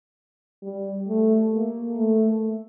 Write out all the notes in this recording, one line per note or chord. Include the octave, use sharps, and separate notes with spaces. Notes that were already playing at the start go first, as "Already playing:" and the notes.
G3
A3
A#3
A3